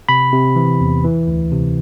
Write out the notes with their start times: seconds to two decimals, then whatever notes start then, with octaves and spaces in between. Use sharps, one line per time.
0.09 C3 B5
0.32 C3
0.56 E3
0.80 E2
1.04 E3
1.28 D2
1.52 C3